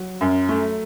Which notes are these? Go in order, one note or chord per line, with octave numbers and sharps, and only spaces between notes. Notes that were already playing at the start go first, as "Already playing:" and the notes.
Already playing: F#3 F#4
F#2
A3